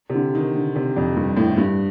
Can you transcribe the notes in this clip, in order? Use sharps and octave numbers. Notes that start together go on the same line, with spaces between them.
C3
D3
D#3
D3
C3
F2
G2
A2
G2